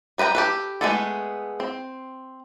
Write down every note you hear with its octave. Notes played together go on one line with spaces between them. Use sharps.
G3 B4 D#5 G5 A#5
G4 A4 B4
G#3 A3 B3 G#4 A4
C4